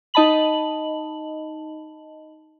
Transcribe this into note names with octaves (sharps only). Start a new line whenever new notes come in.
D#4 D#5 A5 B5 F#7